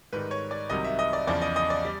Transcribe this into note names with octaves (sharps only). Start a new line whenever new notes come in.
G#2 D#3 G3 B4
C#5
D5
C2 C3 D#3 F#3 D#5
E5
D#5
D5
E2 C#3 F3 D5
D#5
D#5
D5
G3